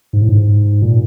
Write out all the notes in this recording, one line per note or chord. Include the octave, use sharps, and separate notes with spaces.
G#2
A2
G#2
A#2